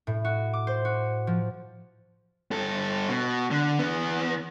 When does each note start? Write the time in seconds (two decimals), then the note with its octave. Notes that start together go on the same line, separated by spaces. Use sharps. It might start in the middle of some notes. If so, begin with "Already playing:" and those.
0.07 A2
0.25 F#4
0.53 D6
0.67 C5
0.85 F#4
1.27 F3
2.51 G2 A4
3.09 B2
3.51 D3
3.79 E2 B3